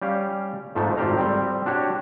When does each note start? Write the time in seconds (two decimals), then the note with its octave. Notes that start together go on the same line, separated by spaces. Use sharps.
0.02 G3 C#4 G4 F5
0.75 F2 G#2 F3 A3
0.97 G#1 F4 G4 A4 F5 A#5
1.18 G3 C4
1.66 D4 F#4 G4 C#5